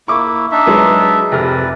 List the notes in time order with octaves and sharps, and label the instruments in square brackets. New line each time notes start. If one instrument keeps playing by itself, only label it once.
[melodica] A#3 E4 [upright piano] C#6 D6
[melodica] D4 D#4 E5
[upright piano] F#3 G#3 B3
[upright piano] F1 C3 F6 [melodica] B4 D5